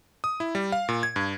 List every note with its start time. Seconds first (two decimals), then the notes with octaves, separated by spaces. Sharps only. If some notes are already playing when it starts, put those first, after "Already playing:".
0.24 D#6
0.40 E4
0.55 G3
0.72 F5
0.89 A#2
1.03 G#6
1.16 G2